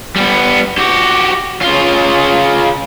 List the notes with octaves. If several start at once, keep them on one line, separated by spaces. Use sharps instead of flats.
G3 B3
F#4 G4
C#3 F4